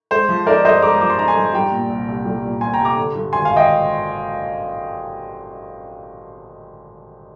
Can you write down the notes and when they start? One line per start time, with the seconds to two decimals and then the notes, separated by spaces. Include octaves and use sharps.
0.11 G#3 C5
0.29 F3
0.47 D#4 A#4 D5
0.65 G2 C5 D#5
0.82 G#3 A#5 D6
1.01 F3 D6
1.10 C6
1.18 D#4 A#5
1.28 G#5 C6
1.36 G2
1.54 G3 G5 A#5
1.72 A#2
1.90 C2
2.08 C2
2.26 G3
2.44 A#2
2.61 C2 G#5 C6
2.73 G5 A#5
2.79 C2
2.85 A#5 D6
2.97 D3
3.15 G2
3.33 G#1 G#5 C6
3.45 F5 G#5
3.51 G#1
3.56 D#5 G5